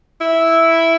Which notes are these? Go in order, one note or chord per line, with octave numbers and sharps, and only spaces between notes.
E4